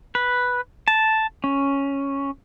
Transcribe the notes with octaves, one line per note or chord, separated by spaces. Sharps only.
B4
A5
C#4